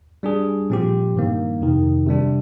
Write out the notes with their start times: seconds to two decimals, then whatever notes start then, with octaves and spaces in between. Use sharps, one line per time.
0.23 G3 D4 G#4
0.70 A#2 F3 C4 G4
1.15 G2 D#3 A#3
1.61 F2 C3 D#3
2.07 C3 G3 D4 G4